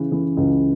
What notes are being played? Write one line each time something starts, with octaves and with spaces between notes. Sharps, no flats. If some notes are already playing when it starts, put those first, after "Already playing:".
Already playing: C#3 E3
E3
C#2